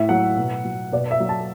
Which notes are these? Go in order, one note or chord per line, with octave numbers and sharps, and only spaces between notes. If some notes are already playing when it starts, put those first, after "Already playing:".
Already playing: A2 E5
F#3 F#5
B2
F#3
B2 D5
E5
F#3
A5